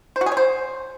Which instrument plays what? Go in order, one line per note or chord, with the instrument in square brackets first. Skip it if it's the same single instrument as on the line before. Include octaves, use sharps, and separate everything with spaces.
[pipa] C5
F#4
G#4
C#5
C5